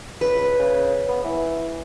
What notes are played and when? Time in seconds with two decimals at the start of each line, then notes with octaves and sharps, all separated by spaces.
0.21 C#2 B4
0.59 C#3
1.08 B3
1.24 E3